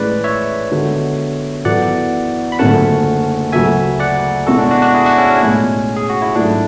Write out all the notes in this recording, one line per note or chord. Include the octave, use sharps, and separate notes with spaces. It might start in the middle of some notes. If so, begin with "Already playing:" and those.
Already playing: A2 E3 G#3 C#4 G#4 B4 D5
C#5 E5
D3 G#3 B3 F#4
F#2 E3 B3 E4 A4 D5 F#5
B5
F#1 F#2 D3 A3 C#4 F#5 A5
D2 C#3 F#3 A3 E5 G#5
D5 F#5
B2 G#3 C#4 E4 F#4 A4
D4
D4 F#4
D4 F#4
E4 G#4
D4 F#4
C#4 E4
C#4
B1 A2 G#3
G#4
F#4
E4
G#2 F#3 A3 D4 E4